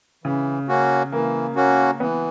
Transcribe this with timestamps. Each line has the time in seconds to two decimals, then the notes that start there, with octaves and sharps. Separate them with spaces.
0.24 C#3 E3
0.68 A#3 C#4 F#4
1.12 E3 A#3
1.56 A#3 C#4 F#4
2.00 E3 B3